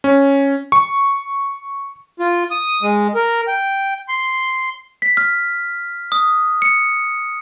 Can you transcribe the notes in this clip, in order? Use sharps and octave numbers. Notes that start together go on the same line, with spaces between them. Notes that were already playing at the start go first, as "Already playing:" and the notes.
C#4
C#6
F4
D#6
G#3
A#4
G5
C6
B6
F6
D#6
C#7